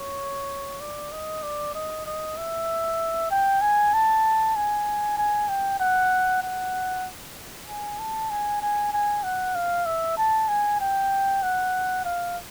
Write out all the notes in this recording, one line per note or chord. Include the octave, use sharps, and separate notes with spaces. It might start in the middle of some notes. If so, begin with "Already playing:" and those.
Already playing: C#5
D5
D#5
D5
D#5
D#5
E5
G5
G#5
A5
G#5
G#5
G5
F#5
F#5
G#5
A5
G#5
G#5
G#5
F#5
F5
E5
A5
G#5
G5
F#5
F5